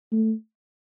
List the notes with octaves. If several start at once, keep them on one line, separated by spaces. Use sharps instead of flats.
A3